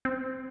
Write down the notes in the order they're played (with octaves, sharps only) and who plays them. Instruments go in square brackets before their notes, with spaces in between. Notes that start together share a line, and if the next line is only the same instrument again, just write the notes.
[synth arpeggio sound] C4